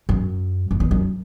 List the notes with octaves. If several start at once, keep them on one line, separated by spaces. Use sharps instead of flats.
F#2
F#2
E2
F#2